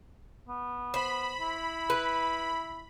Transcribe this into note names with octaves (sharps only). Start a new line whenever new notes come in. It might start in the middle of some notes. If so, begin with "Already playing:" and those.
B3
C5 B5
E4
B4